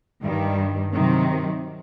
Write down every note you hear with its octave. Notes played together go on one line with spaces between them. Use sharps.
G2 D#3 G3
C3 D#3 F#3